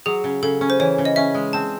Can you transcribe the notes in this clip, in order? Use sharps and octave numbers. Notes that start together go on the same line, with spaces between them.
F#3 G#4
C#3
C#3 A4
C#4
C5
E3 C#5
C#3
D#5
C#4 E5
G#3
C4 A5